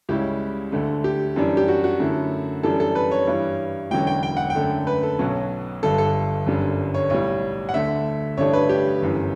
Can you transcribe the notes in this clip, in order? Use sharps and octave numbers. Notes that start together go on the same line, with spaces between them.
C#2 C#3 G3 C#4 E4 G4
D2 D3 A3
G4
F#2 E3 G3 D4
G4
F#4
F#4
F#2 D3 A3 E4
F#2 E3 G3 D4 A4
A4
B4
C#5
G2 E3 G3
E1 E2 D3 F#3 C#4 G5
G5
G5
F#5
G5
F#2 D3 A3
B4
A4
B1 B2 F#3 C#4
G1 G2 D3 A4
A4
G1 F#2 D3 G3
C#5
B1 A2 G3 C#5
F#5
D2 D3 A3 E5
A1 G2 D3 A3 D4 C#5
B4
G4
G1 F#2 E3